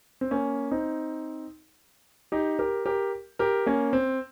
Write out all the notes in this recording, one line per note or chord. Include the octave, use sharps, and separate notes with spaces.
C4
A#3 C#4
C4 D#4
D#4 G4
G4 A#4
G4 A#4
G4 A#4
A#3 C#4
C4